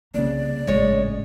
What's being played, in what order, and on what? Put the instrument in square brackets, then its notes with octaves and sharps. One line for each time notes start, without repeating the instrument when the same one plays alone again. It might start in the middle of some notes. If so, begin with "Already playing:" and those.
[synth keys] C2 C#3 [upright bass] A#3 [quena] D5
[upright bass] G#1 A2 [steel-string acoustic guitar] G#3 C#5